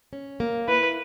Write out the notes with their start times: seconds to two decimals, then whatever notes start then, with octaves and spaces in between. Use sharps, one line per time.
0.13 C#4
0.40 A#3
0.68 E4 B4